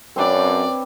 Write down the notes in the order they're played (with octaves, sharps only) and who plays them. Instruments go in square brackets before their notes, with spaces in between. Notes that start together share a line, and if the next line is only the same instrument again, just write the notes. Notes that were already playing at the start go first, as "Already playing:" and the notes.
[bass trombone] F#2 [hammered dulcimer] C4 D4 B4 [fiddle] C#5 D5